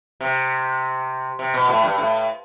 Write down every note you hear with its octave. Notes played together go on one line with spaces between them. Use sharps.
C3
C3
B2
A2
G2
A2